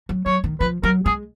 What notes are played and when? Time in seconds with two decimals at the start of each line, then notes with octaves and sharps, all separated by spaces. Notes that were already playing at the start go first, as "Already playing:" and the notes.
0.09 F#3
0.26 F#3 C#5
0.44 D#3
0.60 F3 B4
0.83 F#3 A#4
1.05 G#3 G#4